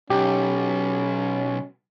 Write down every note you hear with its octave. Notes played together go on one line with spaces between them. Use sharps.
B1 C#4 G4